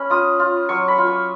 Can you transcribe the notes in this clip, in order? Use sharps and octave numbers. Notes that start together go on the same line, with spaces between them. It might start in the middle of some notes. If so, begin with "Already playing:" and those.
Already playing: C#4 B5
F4 D#6
F4
F#3 C#6
B5
F4
C#6